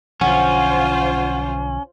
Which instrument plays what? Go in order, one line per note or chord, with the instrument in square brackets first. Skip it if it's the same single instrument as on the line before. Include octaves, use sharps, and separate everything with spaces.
[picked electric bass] B1 D3 F3 [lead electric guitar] C#4 [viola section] F4 C5 [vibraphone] F#5